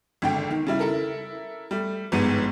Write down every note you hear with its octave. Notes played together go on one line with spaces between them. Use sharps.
G#1 D3 G5
D#3
C#3 G3 E4
E4 A4 A#4
G3 A3
G1 G#2 B3 D#7